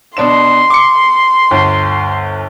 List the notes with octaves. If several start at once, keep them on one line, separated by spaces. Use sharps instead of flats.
B2 D4 C6 E7
D6 C#7
G1 D2